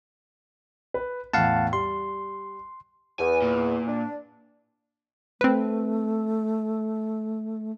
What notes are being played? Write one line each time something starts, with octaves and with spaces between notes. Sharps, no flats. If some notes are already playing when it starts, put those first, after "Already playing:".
B4
E2 A2 F5 F#5 A5
G3 C6
E2 G#5
A#2
D4
A3 C4 B4